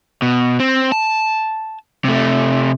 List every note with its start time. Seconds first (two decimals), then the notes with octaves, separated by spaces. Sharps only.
0.22 B2
0.60 C4
0.92 A5
2.05 C3 A3